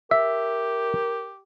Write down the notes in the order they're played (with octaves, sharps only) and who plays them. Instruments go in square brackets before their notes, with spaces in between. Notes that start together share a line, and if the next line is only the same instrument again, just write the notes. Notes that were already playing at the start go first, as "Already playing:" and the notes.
[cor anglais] G4 [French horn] A#4 [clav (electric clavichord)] E5